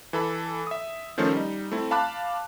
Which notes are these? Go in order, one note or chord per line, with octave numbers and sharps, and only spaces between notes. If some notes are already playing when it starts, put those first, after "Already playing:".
E3 A4 B5
E5 D#6
D#3 F3 A3 C#4 C5
G3 D#4
A3 C4 E4
F5 A5 B5 D6 F#6